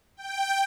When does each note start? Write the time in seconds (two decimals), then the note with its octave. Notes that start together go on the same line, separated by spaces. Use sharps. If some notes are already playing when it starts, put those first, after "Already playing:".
0.17 G5